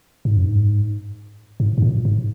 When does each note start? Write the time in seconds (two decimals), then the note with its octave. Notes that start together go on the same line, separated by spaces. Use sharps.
0.25 G#2
0.36 F#2
0.47 G#2
1.60 G#2
1.78 G#2
1.82 A#2
2.05 G#2